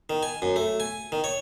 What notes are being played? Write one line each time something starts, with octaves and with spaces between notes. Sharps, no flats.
D#3
G#5
F#2
A3
G#5
D#3
C#5